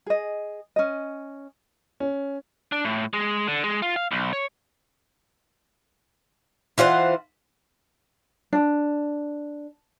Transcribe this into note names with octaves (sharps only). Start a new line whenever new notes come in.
G#4 D#5
C#4 D#5
C#4
D4
A2
G#3
D3
G#3
F4
F5
B1
C#5
E3 F4 C5 F#5
D4